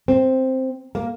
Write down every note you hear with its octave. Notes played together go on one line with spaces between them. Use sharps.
C4
A#3